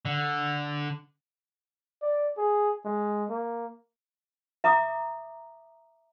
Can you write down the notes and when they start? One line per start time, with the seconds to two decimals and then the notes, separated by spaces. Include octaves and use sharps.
0.05 D3
2.02 D5
2.38 G#4
2.85 G#3
3.30 A#3
4.64 E5 A#5 D6 D#6